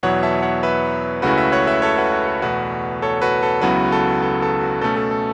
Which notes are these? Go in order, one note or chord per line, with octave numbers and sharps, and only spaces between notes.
E2 B2 F#3 B3 E4 C#5 F#5
E5 A5
C#5 F#5
B4 E5
C#2 C#3 A3 C#4 E4 F#4 B4
B4 E5
C#5 F#5
B4 E5
A4 C#5
F#4 B4
F#4
A4
E2 B2 A3 F#4 B4
A4 C#5
F#4 B4
A4
C#2 C#3 F#3 B3 E4 F#4 B4
A4
A4
A4
F#4
B2 A3 C#4 A4
A4
A4